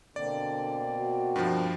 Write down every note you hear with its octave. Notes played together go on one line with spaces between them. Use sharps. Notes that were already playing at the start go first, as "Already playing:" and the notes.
B2 D3 A#3 C4 D5
F#4
G2 F3